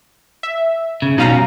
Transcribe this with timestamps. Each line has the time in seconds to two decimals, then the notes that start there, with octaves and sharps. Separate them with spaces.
0.43 E5
1.02 C#3
1.18 B2 G3 C#4 D#4 F5 A#5